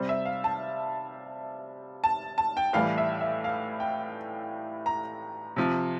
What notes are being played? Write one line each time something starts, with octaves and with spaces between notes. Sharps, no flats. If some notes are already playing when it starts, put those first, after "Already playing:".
Already playing: C3 G3 C5
E5
F5
A5
A5
A5
G5
A2 E3 G3 F5
E5
E5
F5
G5
A#5
C3 F3